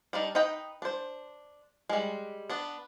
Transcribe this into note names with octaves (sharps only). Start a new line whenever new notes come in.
G3 D4 D#4
D#4 B4 D#5 G5
D4 C5
G3 G#3
B3 D4